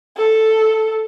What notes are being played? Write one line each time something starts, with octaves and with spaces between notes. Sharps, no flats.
A4